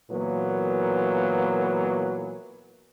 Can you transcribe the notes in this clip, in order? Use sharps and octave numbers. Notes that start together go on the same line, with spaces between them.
A#2 E3 F#3 A#3 B3 B4